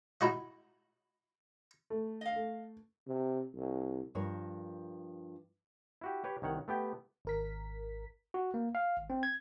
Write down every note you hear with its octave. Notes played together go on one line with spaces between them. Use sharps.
D#4 E4 F#4 D#5
A3
D#5 F5
A3
C3
C2
G2 F3 A#4 C#5
E4 F#4 G4
G4 B4 C#5
C2 D#3 C#5 F#5
A3 B3 G4 G5
G#1 A#4 B6
F#4
A#3
F5
G#1
C4
G#6